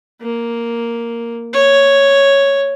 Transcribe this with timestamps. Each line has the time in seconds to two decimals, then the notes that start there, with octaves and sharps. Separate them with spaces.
0.21 A#3
1.53 C#5